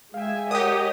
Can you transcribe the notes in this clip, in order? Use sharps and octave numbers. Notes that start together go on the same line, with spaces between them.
G#3 E5 F5 G5 G#5
G4 A#4 C#5 D#5 F#5 D#6